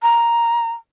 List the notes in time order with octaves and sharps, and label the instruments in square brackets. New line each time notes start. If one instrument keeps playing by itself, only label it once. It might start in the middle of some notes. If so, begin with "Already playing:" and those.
[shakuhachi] A#5